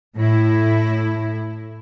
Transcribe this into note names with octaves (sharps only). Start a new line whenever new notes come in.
A2 E4